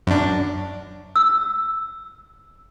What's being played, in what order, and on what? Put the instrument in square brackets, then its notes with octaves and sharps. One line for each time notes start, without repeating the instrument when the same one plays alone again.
[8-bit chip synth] F#2 D4
[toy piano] E6